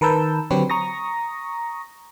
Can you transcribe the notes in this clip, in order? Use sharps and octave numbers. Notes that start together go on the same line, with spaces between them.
D#3 A#4 B4 A5 E6 G6
D3 F#3 C4 G4 B4 C#5
A#5 C#6 D#6 A#6